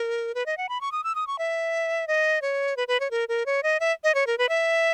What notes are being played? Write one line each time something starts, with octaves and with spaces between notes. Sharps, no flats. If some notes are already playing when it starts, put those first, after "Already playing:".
Already playing: A#4
B4
D#5
F#5
B5
C#6
D#6
E6
D#6
C#6
E5
D#5
C#5
B4
B4
C#5
A#4
A#4
C#5
D#5
E5
D#5
C#5
A#4
B4
E5